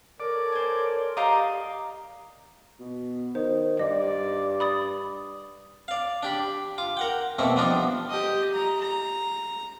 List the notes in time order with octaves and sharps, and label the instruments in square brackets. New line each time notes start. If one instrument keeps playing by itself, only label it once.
[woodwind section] A4 A#4 C#5 [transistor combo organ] D5
[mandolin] C5 G#5
[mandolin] G4 A#5 [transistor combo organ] D5 D#5 [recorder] F5
[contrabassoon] B2
[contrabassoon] D#3 [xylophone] C5
[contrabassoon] G2 [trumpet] D5 [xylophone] D#5
[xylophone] B5 D#6 A6
[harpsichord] D5 F5
D4 G4 B5
F4 D6
A#4 F#5 G5
B2 A3 A#3 C4 E4 A4
F3 G3 B3 D4 D#4 F4
[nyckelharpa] G4 D#5
A#5
A#5